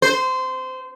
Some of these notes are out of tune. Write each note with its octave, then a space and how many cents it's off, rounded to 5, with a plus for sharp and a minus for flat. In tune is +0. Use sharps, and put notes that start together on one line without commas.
C5 -20